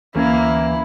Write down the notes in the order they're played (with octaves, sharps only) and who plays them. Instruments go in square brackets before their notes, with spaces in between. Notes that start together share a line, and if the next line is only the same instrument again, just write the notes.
[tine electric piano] D2 C#4 G#6 [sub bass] E3 [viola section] A#3 [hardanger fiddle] E4